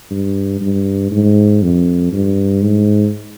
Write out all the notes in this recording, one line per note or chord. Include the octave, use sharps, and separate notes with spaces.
G2
G2
G#2
F2
G2
G#2